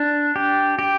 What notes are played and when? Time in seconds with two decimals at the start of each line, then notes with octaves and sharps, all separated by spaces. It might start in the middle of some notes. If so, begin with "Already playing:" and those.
Already playing: D4
0.36 G4
0.79 G4